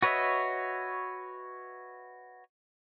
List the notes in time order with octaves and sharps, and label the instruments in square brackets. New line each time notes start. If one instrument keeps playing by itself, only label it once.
[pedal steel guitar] F#4 B4 C#5 D#5 E5